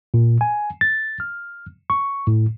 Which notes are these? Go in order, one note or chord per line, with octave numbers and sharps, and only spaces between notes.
A#2
G#5
A6
F6
C#6
A2